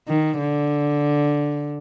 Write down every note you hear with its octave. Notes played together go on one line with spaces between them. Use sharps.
D#3
D3